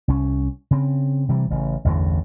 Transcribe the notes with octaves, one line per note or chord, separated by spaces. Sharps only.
C2 C#4
C#3 C4
C3 E3 G3
A1 C#3
A1 E2 G2 D3